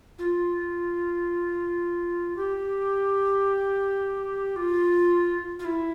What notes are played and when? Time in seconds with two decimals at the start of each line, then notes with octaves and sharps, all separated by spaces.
0.19 F4
2.36 G4
4.56 F4
5.59 F4
5.65 E4